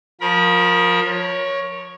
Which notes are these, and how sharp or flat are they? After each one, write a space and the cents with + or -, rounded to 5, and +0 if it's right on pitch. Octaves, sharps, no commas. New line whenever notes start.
F3 +25 A#4 +0 B5 -40
A#4 +35 C#5 +0